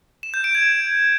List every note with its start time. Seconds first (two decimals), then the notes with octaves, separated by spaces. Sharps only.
0.23 E7
0.34 G6
0.44 D7
0.55 G#6